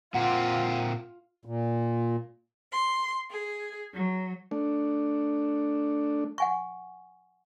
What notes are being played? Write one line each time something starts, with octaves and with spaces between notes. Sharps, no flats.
A#2 C4 F4 F#5
A#2
C6
G#4
F#3
A3 D4
F#5 G#5 C#6